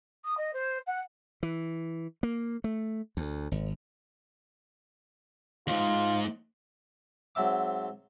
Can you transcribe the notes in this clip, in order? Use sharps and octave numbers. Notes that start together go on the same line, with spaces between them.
D#6
D#5
C5
F#5
E3
A#3
A3
D2
G#1
D#2 G#2 F4
G#2 F#3 C4 E5 D6